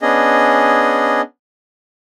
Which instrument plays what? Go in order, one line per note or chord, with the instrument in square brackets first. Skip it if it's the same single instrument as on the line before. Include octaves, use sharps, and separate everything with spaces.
[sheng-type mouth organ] B3 C#4 D4 G#4 D#5